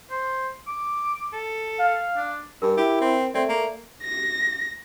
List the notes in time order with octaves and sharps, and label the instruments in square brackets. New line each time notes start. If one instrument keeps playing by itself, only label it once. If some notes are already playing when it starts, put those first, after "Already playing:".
[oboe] C5
D6
A4
[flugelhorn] F5
[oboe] D4
[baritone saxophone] G2 [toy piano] A#4
[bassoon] E4 [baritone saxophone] G4
[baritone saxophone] C4
[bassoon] A3 [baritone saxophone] C4 [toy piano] D5
[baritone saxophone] A#3
[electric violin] A#6